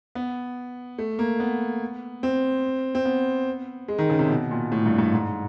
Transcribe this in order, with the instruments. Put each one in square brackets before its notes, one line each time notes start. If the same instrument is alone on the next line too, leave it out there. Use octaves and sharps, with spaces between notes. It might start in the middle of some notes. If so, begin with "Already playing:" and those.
[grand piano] B3
A3
A#3
B3
C4
C4
B3
G#3
D#3
C#3
C3
B2
A#2
A2
G2
G2
G#2